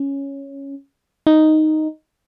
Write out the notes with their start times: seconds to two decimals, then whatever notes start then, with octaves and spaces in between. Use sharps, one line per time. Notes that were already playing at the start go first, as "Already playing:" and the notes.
Already playing: C#4
1.27 D#4